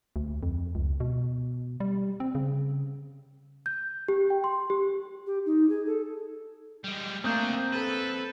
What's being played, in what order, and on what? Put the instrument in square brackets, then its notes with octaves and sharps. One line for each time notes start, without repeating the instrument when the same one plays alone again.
[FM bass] D2
F2
C#2
B2
G3
C4
C#3
[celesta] G6
G4
G5
C6
G4
[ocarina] G4
D#4
G#4
A4
[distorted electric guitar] G3 G#3
[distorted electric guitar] A3 D4 [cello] A#3 [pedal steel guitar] C4 D#6 G6
[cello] A4 [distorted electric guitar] B4